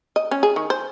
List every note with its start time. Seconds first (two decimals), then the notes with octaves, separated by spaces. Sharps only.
0.16 D#5
0.31 C#4
0.43 G#4
0.56 D#3
0.70 C5